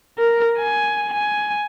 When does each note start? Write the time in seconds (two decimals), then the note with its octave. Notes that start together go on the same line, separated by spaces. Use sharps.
0.19 A#4
0.59 G#5
1.13 G#5